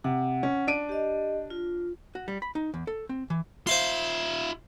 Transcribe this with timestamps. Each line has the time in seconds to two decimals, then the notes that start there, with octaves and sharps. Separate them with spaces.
0.04 C3 F#5
0.43 C#4
0.67 D4 D7 D#7
0.89 G4 D#5
1.50 F4
2.15 F#4
2.28 G3
2.42 B5
2.55 D#4
2.74 E2
2.87 A4
3.09 C4
3.30 E3
3.67 F4 C5 E5 F5 C6